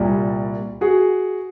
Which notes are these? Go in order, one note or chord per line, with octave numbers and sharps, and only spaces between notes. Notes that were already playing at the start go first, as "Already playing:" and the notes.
Already playing: C2 A#2 G3
F#4 G#4